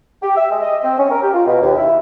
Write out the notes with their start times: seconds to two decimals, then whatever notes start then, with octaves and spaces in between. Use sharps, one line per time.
0.22 G4
0.36 E5
0.51 G#3
0.62 D#5
0.84 C4
0.99 C#4
1.11 A#4
1.23 G4
1.34 F4
1.47 B2
1.62 D#2
1.77 E4